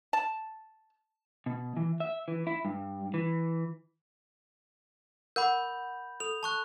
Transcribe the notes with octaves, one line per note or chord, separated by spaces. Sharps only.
A5
B2
E3
E5
E3
E4
G2
E3
A#4 F#5 B5 D6 G6
A4 F7
A5 C#6 F#6